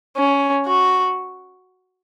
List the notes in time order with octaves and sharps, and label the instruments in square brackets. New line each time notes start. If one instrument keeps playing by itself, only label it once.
[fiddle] C#4
F#4